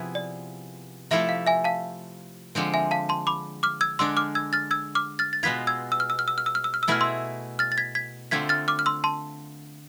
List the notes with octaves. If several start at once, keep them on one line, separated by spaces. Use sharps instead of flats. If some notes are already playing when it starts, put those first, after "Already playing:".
Already playing: C3 F3 B3 E4 G#4
D5
C3 F3 A3 E4 A4 E5
F5
E5 G#5
F5 A5
D3 F3 G#3 C4
E5 G#5
F5 A5
A5 C6
B5 D6
D6 F6
E6 G#6
D3 G#3 D4 C6 E6
D6 F6
E6 G#6
F6 A6
E6 G#6
D6 F6
F6 A6
A6
B2 G#3 B3 F4 G#6 B6
E6 G#6
E6
F6
E6
F6
E6
F6
E6
F6
E6
F6
E6
B2 A3 E4 G#4 F6
C6 E6
F6 A6
A6
G#6 B6
G#6 B6
D3 A3 C4 F4 G#6 B6
F6 A6
D6 F6
F6
C6 E6
A5 C6